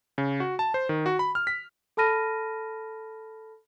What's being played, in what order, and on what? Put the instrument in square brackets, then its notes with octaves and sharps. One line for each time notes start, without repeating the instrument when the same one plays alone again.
[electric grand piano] C#3
F#4
A5
C5
D#3
F#4
B5
F6
B6
[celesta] A4 A5 B5 F6 A#6 D#7